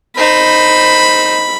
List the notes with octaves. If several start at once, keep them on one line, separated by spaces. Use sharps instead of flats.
D#4 C5 B5